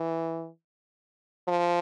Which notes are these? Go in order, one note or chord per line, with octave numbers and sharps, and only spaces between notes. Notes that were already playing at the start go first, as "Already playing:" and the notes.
Already playing: E3
F3